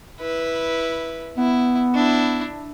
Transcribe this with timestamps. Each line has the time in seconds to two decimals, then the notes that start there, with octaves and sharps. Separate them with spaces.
0.20 E4 B4
1.38 B3 E4
1.95 D4 E4